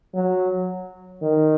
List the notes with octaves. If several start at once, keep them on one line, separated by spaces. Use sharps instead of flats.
F#3
D#3